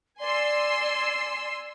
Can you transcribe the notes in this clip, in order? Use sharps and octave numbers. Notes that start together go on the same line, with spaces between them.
D5 G#5 C6 E6